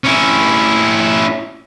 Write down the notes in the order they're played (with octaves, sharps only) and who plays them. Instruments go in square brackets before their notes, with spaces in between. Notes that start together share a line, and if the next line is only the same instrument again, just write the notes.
[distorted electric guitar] C#4 E4